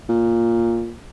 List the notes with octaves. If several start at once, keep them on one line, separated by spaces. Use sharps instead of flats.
A#2